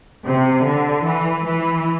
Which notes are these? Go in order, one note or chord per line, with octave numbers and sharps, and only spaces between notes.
C3
D3
E3
E3